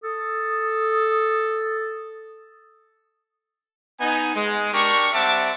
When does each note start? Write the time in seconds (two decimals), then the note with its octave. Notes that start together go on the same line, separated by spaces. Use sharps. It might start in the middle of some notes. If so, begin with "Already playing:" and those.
0.04 A4 D#6
4.00 B3 D#4 G#5
4.35 G#3
4.73 D4 G4 A#4 C#6
5.13 G3 C4 E5 F#5 A5 D6